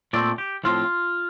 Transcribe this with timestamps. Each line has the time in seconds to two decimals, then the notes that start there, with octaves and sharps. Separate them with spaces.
0.13 A#2 A3 C4 D5
0.38 G4
0.64 A2 F3 C4 F4